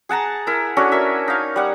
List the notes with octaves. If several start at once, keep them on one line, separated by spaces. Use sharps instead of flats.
G#4 F#5 A5 A#5
E4 A#4
C#4 D4 F#4 A4
A#4 E5
D#4 F5
G3 F#5